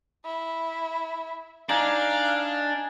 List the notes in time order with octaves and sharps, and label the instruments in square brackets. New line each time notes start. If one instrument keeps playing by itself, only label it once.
[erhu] E4
[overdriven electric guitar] D4 [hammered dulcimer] D#4 G#4 [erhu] F5